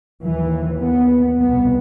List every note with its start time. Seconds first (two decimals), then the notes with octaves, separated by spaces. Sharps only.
0.23 D#2 E3
0.81 B3
1.39 C2 B2 B3